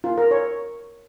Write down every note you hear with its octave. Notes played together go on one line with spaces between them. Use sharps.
F4
A#4
C#5